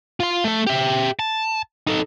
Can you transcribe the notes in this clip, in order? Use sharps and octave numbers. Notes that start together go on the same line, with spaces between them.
F4 C6
A3 A4
G4 E5
A5
D#4 A4